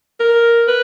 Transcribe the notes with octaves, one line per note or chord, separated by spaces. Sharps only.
A#4
B4